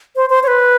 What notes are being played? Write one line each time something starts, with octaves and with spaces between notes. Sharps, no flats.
C5
C5
C#5
B4